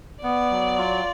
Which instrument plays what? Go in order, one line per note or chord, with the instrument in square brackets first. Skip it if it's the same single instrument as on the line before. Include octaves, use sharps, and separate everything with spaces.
[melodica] B3 [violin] D5
[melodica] F#3
F4